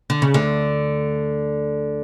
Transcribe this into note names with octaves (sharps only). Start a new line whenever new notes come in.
D3
C#3
D2 D3